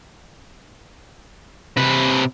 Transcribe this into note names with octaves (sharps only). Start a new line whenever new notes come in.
C3 B4